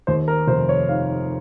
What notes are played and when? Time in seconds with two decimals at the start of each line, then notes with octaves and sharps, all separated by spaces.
0.07 D#2 C5
0.28 A#4
0.47 F1 C5
0.69 C#5
0.89 D#3 F5